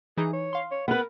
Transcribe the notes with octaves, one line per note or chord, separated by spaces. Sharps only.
E3 D#4 G#4
C#5
F5 C6
C#5
B3 A#4 B4